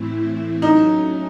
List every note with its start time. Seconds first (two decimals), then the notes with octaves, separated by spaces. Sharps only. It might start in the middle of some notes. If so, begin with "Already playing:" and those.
Already playing: A2 E3 A3 C4 E4
0.62 F#3 A3 C#4 D#4